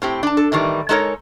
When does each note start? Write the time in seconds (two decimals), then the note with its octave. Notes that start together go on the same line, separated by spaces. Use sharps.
0.02 A2 C4 G4
0.23 D4 A5
0.37 A4
0.52 A2 D#3 E3 G3
0.89 G#3 D#4 A4 A#4 C#5